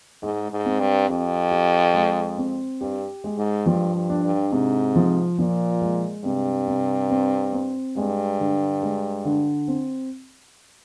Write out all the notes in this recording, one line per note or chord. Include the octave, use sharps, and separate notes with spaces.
G#2 G#3
G#2
C4
G2
F2 G4
G4
G#3
C4
G2 G4
G#3
G#2
G2 F3
G2
D4
G2
G#2 C3
F3
A#2 F3
G#3
G2 C3
C3
C4
C4
G2 G#3
D3
G#3
D3
C4